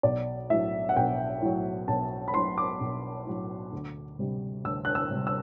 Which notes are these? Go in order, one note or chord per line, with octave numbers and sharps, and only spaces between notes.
B1 D5
A2 F#3 E5
F#5
B1 G5
A2 F#3
B1 A5
B5
A2 F#3 C6
D6
B1
A2 F#3
D2
C3 G3
D2 E6
F#6
E6
C3 G3
E6